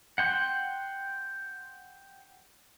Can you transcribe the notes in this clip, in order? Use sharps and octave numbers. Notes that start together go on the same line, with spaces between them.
F#5 G5 C6